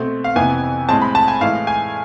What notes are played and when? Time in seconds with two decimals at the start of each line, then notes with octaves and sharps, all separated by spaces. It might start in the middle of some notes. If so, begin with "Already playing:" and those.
Already playing: B2 A3 C4
0.24 F5
0.36 F2 C3 E3 B3 G#5
0.89 A2 G#3 C4 A5
1.02 B5
1.15 A5
1.28 G#5
1.41 A2 E3 G#3 F5
1.67 G#5